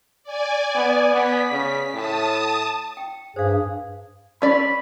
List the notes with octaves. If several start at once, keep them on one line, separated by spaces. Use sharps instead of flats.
D5 G#5
B3
B3 B6
C#3
A2 A5 D#6
G5
G2 G#4 C5 F5
C#4 D5 B5